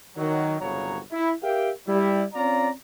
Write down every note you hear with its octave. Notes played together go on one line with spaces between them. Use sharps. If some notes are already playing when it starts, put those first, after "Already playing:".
D#3 F#3
G1 C2 C#3 F#3 C#5 A#5
E4
G4 A#4 E5 F5 G5
G3 E4
C4 C#4 F4 D5 A#5